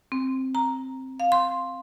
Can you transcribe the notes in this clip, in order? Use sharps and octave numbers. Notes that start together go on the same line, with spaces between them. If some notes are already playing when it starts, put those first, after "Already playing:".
C4
A#5
F5
C6